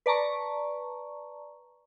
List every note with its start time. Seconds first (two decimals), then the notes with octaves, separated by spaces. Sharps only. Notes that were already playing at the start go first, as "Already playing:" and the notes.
0.06 B4 D5 A5 A#5 C#6